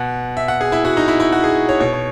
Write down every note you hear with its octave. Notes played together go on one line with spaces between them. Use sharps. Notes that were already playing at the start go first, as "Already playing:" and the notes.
Already playing: B2 F#5
E5
F#5
G#4
E4
F#4
D#4
E4
E4
F#4
G#4
C#5
B2 C#5
C#5